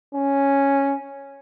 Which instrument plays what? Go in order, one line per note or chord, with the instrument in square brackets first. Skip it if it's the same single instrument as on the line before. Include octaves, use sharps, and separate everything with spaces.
[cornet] C#4